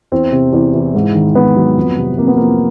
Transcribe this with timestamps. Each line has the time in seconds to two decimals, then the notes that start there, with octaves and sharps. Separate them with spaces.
0.12 E2 C4
0.32 C3
0.53 E2
0.74 E3
0.95 G#2
1.14 D#3
1.35 G#2 B3
1.56 F#3
1.77 F2
1.98 C3
2.18 F2 A#3
2.28 B3
2.37 F3 A#3